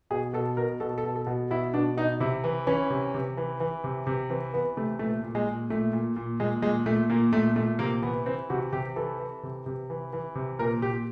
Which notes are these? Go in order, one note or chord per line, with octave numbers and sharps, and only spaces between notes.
B2 G#4
B2 A4
B2 A#4
B2 A4
A4
B2
A4
B2
B2 E4
B2 D4
B2 D#4
C3 E4
E3
E3 C#4
C3
C3
E3
E3
C3
C3
E3 C4
E3 B3
C3 A3
A#2 A3
A#2
G#3
A#2
A#2 A3
A#2
A#2
A#2 G#3
A#2 G#3
A#2 A3
A#2 A#3
A#2 A3
A#2 A3
C3 A#3
E3 B3
E3 C4
C3 F#4
C3 G4
E3 A4
E3
C3
C3
E3
E3
C3
A#2 A#4
A#2 G4